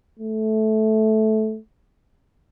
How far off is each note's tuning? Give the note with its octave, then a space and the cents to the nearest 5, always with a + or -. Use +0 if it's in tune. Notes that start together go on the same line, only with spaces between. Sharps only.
A3 -10